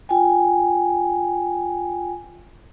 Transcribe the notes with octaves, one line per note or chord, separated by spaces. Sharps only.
F4 G5 G#5